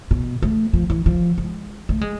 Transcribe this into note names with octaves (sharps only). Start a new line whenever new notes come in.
B2
A3
F3
E3
F3
G#3
A3
G#3